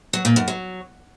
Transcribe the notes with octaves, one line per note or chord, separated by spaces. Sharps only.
F#3
A#2
F#2
F#3